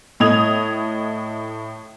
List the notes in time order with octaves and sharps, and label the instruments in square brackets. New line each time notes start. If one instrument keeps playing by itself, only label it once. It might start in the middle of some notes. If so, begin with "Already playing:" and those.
[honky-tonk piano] A2 D#5 D#6 G#6 F7